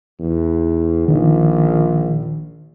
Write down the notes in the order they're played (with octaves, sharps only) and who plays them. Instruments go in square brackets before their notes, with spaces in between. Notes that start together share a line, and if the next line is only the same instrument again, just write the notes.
[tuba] E2
[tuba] A#1 [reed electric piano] D#3